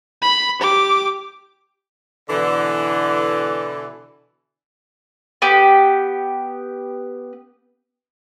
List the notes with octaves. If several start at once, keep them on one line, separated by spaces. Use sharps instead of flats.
B5
G4 D6
B2 D3 E3
B3 G4